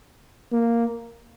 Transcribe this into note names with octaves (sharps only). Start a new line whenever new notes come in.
A#3